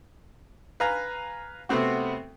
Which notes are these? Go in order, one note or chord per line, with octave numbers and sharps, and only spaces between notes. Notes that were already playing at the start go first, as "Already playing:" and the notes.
B4 F5 G#5 A#5
C3 A3 B3 C4 F#4